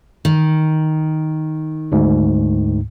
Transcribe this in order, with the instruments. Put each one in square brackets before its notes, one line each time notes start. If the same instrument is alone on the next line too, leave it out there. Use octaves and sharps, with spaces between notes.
[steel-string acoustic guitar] D#3
[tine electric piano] D2 G#2